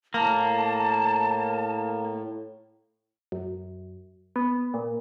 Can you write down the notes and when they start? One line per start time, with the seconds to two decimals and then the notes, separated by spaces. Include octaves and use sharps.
0.14 A2 A#3 A5
3.32 F#2
4.36 B3
4.74 A#2